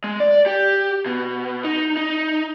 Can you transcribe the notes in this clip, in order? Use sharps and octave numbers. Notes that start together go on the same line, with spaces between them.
G#3
D5
G4
B2
D#4
D#4